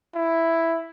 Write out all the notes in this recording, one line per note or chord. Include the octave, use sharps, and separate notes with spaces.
E4